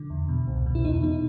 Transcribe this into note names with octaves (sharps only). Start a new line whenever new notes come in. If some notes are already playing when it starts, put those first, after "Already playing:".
Already playing: D3
E2
B2
C2
B2
E4
E2 D#4
B2 D#4